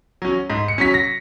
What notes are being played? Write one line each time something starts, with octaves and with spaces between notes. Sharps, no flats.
F#3 C#4
G#2
C#7
F#3 C#4 B6
A#6